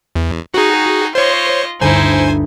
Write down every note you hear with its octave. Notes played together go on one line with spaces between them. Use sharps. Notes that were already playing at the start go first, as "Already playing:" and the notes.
E2
D#4 F#4 G#4 G5 C#6
F4 C5 C#5 D#5
G1 D2 G2 D#4 E4 C5 G#5